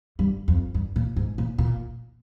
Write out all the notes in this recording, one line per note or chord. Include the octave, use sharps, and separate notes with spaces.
G2
F2
G2
A#2
G#2
A#2
A#2